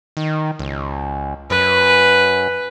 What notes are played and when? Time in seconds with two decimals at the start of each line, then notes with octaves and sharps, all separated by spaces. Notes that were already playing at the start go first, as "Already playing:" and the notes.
0.17 D#3
0.59 C#2
1.50 F#2 B4